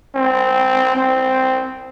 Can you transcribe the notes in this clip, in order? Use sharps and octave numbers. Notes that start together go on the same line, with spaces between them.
C4
C4